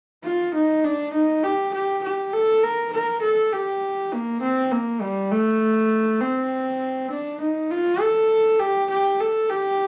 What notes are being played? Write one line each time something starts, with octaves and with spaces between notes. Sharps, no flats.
F4
D#4
D4
D#4
G4
G4
G4
A4
A#4
A#4
A4
G4
A#3
C4
A#3
G3
A3
C4
D4
D#4
F4
A4
G4
G4
A4
G4